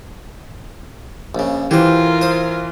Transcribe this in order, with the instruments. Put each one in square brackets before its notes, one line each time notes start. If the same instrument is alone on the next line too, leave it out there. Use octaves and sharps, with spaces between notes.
[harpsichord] A#1 C#3
[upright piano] E3 [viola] F4 A#4 [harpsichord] G4 C5
[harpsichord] C5 D#6